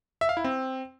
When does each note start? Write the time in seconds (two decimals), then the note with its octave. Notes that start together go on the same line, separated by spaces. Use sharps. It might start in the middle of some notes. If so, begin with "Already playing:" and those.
0.21 E5
0.29 F5
0.37 E4
0.44 C4